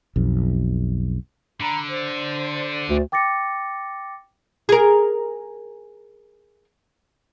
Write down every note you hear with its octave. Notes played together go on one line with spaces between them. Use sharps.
B1 F2
D3 A#5 B5
C5 D5
D2
G5 D6 A6 A#6 C#7
G#4 A#4